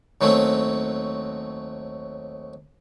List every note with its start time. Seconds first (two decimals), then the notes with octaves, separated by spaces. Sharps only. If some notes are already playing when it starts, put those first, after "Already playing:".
0.21 D#2 F#3 A3 C4 C#4